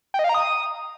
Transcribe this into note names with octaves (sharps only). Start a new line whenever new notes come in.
G5
D#5
F5
A#5
D#6